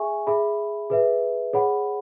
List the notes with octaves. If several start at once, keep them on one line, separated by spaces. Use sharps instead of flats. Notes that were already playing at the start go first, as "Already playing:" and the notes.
Already playing: G#4 E5 G#5 C#6
G#4 E5 B5
G#4 B4 E5
G#4 C#5 F#5 B5